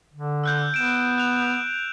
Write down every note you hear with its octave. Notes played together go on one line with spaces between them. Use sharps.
D3
E6 F#6 G6
B3 D7 E7
F#6 F7